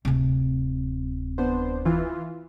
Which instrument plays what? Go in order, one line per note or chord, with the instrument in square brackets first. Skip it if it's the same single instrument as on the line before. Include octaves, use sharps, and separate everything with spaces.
[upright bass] D1 C3
[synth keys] B3 D4 C5
E3 F4